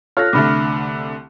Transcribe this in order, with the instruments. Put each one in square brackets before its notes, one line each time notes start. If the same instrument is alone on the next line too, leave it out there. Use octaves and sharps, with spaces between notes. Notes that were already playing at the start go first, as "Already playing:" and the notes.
[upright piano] F4 A4 C#5 [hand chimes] F6 F#6 A#6
[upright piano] C2 D3 A3 [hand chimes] B5 D6